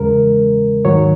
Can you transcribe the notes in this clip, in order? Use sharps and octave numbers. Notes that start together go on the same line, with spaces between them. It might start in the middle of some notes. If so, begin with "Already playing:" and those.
Already playing: E2 C#3 G#3 A#4
G#2 D#3 F#3 C#5